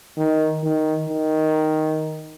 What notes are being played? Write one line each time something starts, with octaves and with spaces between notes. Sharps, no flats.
D#3
D#3
D#3